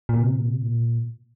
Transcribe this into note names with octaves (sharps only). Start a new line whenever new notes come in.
A#2
C3
A#2
C3
A#2